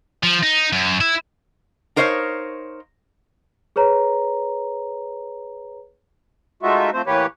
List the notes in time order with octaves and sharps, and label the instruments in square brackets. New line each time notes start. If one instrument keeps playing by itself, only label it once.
[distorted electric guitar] F3
D#4
F#2
E4
[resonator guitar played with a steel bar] D#4 A#4 C5 C#5 D#5 F5
[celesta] G#4 B4 C#5 A#5
[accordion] G#3 A3 D#4 F4 F#4 E5
F3 A3 C4 C5
A2 E3 A#3 G4 B4 C#5